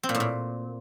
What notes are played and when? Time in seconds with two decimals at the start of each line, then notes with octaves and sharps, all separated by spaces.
0.03 C4
0.09 A#2
0.15 A2
0.20 A#2